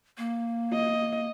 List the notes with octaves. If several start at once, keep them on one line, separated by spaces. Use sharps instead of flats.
A#3
D#5